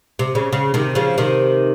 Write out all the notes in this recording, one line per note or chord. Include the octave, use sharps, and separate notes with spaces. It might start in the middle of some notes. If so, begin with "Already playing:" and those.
C3
C#3
C#3
C3 D#3
C#3 F3
C3 D#3